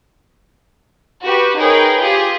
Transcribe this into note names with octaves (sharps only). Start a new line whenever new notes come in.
F#4 G4 B4
D#4 G#4 A#4 B4 C#5 G5
F4 G4 G#4